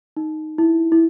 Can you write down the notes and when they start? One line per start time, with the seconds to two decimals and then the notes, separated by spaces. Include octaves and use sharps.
0.17 D#4
0.58 E4
0.92 E4